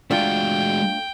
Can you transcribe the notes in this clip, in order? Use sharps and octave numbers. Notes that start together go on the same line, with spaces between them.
G#3 A3 D4 F4 F#4 G5